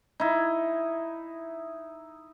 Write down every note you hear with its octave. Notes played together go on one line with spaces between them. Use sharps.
D#4 E4